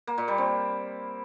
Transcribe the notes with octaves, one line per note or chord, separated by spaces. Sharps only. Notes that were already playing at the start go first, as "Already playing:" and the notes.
A#3
A#2
G3
C4